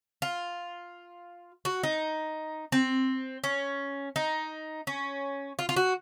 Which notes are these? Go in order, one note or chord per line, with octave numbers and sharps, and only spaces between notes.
F4
F#4
D#4
C4
C#4
D#4
C#4
F4
F4
F#4